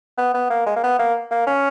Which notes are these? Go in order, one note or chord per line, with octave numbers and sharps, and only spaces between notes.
B3
B3
A#3
G#3
A#3
B3
A#3
A#3
C#4